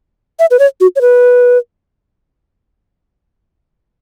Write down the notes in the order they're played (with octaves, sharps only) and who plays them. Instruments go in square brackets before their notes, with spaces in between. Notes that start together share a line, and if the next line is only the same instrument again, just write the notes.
[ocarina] E5
B4
C#5
F#4
C#5
B4